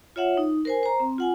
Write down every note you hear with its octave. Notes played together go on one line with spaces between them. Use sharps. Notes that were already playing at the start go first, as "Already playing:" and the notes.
F4 C#5 E5 F#5
D#4
A#4 C5 G#5
C5 A#5
C4
F4 F#5 G#5